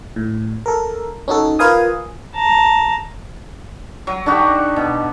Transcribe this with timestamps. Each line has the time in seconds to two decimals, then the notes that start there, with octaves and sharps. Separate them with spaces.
0.16 A2
0.66 A4 A#4
1.28 C#4 D#4 F#4 A4
1.59 F4 A#4 B4 F5 G#5 D#6
2.34 A5 A#5
4.07 F#3
4.26 D3 D#4 F#4 G4
4.76 B2